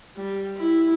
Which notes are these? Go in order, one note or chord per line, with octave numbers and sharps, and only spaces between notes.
G3
E4